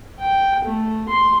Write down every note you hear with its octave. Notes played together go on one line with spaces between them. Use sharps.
G5
A3
C6